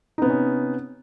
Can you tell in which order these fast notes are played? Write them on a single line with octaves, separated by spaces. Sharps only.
D#4 B3 C3 C#4